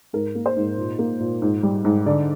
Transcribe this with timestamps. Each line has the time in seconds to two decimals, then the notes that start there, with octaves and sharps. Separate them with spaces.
0.13 G#2 A#4
0.35 A#3
0.46 C5
0.57 G#2
0.78 A#2
0.99 A#3
1.20 A#2
1.42 G#2
1.63 G3
1.85 G#2
2.06 D3 D5